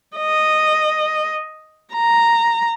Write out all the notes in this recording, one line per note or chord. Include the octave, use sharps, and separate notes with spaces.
D#5
A#5